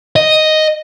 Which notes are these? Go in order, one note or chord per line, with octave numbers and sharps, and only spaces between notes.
D#5